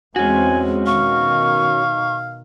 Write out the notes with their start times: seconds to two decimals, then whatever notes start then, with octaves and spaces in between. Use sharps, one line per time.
0.16 E2 G#3 C4 C#4 F#4 G#5
0.86 B2 D#3 F5 C#6